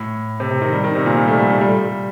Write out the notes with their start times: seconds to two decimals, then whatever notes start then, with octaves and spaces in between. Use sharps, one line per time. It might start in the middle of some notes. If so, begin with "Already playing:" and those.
Already playing: A2
0.40 C3
0.51 C3
0.62 D#3
0.73 G3
0.84 D#3
0.95 C3
1.06 A#2
1.17 G3
1.28 A3
1.39 G3
1.50 A3
1.61 G3